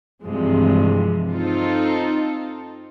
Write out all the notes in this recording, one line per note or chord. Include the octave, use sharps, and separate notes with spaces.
G2 C3 E3 F3 G#3
C4 D#4 F4 A4